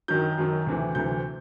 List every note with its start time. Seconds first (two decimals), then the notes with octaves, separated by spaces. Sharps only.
0.08 F#2 D#3 F#3 G6
0.38 F#2 D#3 F#3
0.67 D2 C3 E3
0.95 D2 C3 E3 G6